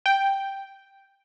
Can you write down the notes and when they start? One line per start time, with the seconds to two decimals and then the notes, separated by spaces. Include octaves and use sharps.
0.06 G5